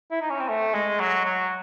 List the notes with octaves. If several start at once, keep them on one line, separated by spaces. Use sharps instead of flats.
E4
D#4
C#4
C4
A3
G#3
F#3
F#3